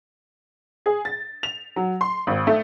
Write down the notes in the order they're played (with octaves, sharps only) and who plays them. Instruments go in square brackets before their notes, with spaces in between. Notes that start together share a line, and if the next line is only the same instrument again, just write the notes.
[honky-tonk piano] G#4
A6
F7
F#3
C6
G#1
A3